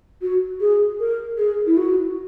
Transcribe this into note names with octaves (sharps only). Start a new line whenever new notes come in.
F#4
G#4
A#4
G#4
E4
F#4